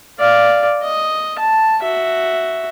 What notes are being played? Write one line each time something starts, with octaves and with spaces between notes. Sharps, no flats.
D5 F5
D#5
A5
F#4 E5